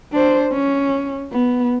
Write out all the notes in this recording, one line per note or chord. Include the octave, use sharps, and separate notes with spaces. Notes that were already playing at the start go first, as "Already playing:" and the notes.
D4 C5
C#4
B3